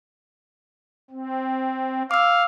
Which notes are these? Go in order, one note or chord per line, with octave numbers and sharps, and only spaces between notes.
C4
F5 D6 E6